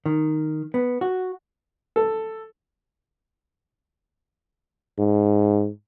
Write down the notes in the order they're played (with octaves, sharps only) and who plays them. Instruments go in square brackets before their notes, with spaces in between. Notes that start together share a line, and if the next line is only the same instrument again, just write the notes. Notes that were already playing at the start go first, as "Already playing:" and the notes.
[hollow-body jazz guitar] D#3
B3
F#4
[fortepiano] A4
[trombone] G#2